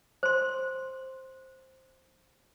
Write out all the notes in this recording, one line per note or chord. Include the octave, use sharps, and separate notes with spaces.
C5 C6